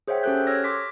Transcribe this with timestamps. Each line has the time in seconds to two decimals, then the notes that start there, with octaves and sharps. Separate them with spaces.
0.08 G#4 C5 C#5 E5 F#5 G5
0.23 C#4 G4 A4 C5 F#6 G6
0.47 C#5 E6 F6 G#6 A#6
0.64 C6 D6 B6